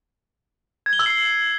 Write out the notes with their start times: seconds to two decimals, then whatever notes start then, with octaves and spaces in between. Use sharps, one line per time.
0.86 G#6
0.93 G7
0.99 E6
1.06 C7